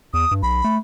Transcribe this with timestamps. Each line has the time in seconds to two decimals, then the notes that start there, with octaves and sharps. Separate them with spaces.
0.14 E2 D#6
0.31 G2
0.43 B1 B5
0.64 A3